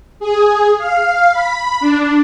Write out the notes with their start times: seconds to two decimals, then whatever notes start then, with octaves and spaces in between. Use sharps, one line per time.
0.20 G#4
0.78 F5
1.31 B5
1.80 D4